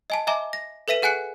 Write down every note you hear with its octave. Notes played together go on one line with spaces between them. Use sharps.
D#5 G#5 A5
D#5 E5 G#5 A#5 D6
A#6
A4 B4 E5 B6 D#7
G#4 F#5 G#5 F#6 C#7